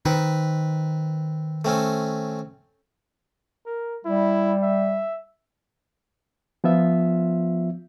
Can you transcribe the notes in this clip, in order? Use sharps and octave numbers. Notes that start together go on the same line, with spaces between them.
D#3 C4 B4
A3 C4 C#4
A#4
G3 E4
E5
F3 B3 F4 E5